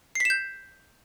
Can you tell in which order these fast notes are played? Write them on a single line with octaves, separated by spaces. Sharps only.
C7 B6 E7 G6